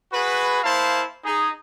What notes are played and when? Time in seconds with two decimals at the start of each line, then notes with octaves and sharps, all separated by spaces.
0.12 F#4 G#4 B4
0.64 A#3 E4 C5 F5 A5
1.25 D#4 G#4